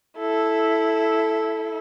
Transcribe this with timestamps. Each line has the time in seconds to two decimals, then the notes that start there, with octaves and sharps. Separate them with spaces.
0.18 E4 A4